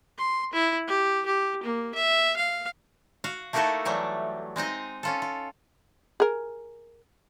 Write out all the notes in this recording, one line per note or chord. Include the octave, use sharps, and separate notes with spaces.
C6
E4
G4
G4
A#3
E5
F5
F#4 F5
A3 A#3 D#4 E4 F#4 A4
E3 F#3 G3 A3
G#3 C4 D#4 D#5
C#4 F4 A4
F4
G#4 A#4